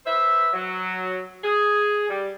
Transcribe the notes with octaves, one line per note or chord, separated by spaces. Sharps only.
B4 C5 E5
F#3
G#4
G3